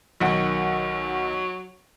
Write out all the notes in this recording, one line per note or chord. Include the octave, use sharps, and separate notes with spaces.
B1 D#3 F#3 F#5